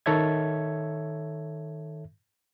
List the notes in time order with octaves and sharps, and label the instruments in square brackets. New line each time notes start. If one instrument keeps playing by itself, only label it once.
[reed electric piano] D#3 A4 C#5 E5 G#6